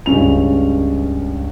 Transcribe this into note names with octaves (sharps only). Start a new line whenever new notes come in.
C#2 G2 C#4 F7